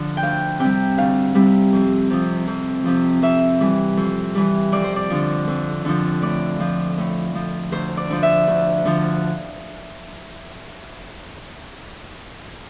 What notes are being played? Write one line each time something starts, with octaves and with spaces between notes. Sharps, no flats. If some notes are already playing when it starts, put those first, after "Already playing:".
Already playing: D3 F3
G5
D2 F5
C3 G3 G5
D2 F5
C3 G3
F2
C3 F3
F2
C3 F3
F2 E5
E3 G3
F2
E3 G3
F2 D5
C5
D5
D3 F3
F2
D3 F3
A2 D5
F3
A2
F3
D2 C5
D5
D3 F3
E5
D2
D3 F3